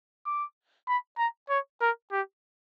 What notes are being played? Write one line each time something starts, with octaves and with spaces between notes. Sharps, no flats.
D6
B5
A#5
C#5
A#4
G4